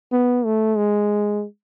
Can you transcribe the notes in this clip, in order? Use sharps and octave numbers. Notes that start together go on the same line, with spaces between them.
B3
A3
G#3